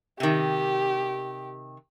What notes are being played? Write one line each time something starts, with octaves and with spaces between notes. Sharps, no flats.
C3 D#3 G4